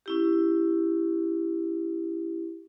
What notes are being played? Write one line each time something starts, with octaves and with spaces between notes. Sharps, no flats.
C#4 E4 G4